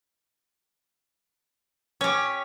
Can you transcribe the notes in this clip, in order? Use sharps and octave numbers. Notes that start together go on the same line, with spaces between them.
C#4 G4 C#5